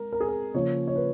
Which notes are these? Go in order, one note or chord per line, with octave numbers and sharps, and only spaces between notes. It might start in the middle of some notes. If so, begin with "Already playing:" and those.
Already playing: G#3 A#4
A#4
G#4
A#4
C#3 F3 A#3 C#4 C#5
C#5
B4